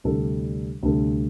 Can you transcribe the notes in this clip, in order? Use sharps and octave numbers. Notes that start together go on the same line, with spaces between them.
D2 C3 G3 D4 A4
D2 C3 G3 D4 A4